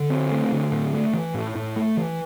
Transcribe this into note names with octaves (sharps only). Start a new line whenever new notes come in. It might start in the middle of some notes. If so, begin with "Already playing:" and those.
Already playing: D3
C4
A3
D3
A2
A3
E3
A2
A2
A3
E3